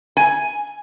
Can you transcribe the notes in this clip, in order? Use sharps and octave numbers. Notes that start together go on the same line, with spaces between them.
G#5